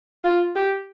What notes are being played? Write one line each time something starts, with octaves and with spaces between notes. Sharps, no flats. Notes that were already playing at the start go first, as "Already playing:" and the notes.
F4
G4